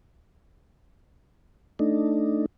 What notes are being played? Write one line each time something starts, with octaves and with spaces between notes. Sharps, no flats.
A3 D4 D#4